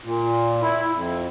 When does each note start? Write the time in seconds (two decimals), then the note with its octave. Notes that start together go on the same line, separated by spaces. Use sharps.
0.04 A#2
0.61 E4
0.93 F2